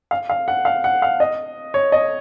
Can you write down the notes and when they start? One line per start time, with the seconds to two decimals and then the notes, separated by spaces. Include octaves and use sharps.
0.11 F5
0.30 F5
0.48 F#5
0.65 F5
0.84 F#5
1.02 F5
1.20 D#5
1.74 C#5
1.92 D#5